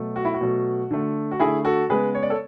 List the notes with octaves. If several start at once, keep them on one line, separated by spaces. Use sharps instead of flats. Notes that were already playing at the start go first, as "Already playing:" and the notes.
Already playing: B2 F#3 A3
F#4
E4
F#4
B2 F#3 A3
D3 A3
F#4
D3 A3 E4 G#4
F#4 A4
C#3 G#3 B3 G#4 B4
C#5
D5
A4 C#5